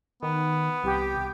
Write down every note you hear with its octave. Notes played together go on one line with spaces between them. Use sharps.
D#3 B3
C2 G4